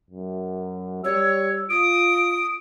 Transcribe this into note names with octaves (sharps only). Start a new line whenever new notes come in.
F#2
G3 C#5 E6
F4 D#6 D7